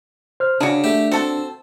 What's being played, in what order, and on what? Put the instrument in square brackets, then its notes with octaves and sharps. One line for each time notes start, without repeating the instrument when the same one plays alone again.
[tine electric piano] C5 F6
[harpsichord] C#3 [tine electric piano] D4 [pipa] F#4 G#4
[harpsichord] A3 G4
[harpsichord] C4 [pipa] F#4 A4